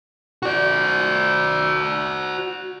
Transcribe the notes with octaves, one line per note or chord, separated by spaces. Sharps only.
F#4 D5